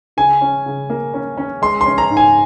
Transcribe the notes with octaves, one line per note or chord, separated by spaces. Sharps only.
C#3 G#5
C#4
C#3
A#3
C#4
C#4
G#3 C6
C6
C#4
A#5
G#2
G#5